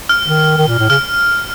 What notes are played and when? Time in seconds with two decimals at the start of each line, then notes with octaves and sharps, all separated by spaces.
0.09 F6
0.25 D#3
0.57 D#3
0.68 A#2
0.78 A2
0.90 C#3 F6